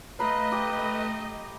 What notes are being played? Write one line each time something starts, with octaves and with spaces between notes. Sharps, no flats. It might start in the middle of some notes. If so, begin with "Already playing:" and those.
A3 B4 D#5 F5 A#5 B5
G4